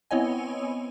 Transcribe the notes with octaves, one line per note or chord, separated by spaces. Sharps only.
B3 C4 E4 C#5 D#5 G#5